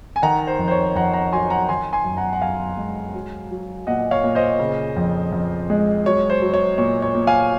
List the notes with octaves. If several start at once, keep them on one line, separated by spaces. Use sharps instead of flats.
G#5
D#3 F#5 A#5
C5
F2
C5
C#5
F2 F#5 A#5
F#5 A#5
F#3 G#5 C6
F#5 A#5
D#3 G#5 C6
G#5 C6
F#2
F#5 A#5
F#5
F#2 F5 G#5
G#3
F#3
F#3
A#2 D#5 F#5
C#5 F5
A#2
C5 D#5
C#3
F2
F2
G#3
F#3 C#5
C5
F#3
C#5
A#2 C#5
C#5
A#2
F5 G#5